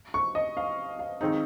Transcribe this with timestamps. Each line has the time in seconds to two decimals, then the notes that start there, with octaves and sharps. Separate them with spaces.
0.14 C#6
0.35 D#5
0.57 F5
0.99 F5
1.21 D#3 G#3 C4 D#4